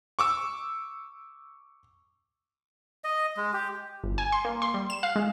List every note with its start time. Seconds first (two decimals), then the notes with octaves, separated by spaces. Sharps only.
0.19 C#6 D6 E6
3.04 D#5
3.37 G#3
3.53 G4
4.04 G1
4.18 G#5
4.32 C6
4.45 A#3
4.62 C6
4.74 G3
4.90 E7
5.03 F5
5.16 G#3